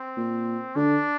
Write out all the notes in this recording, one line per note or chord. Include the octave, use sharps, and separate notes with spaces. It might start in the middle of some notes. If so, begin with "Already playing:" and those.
Already playing: C4
A#2
D3 D4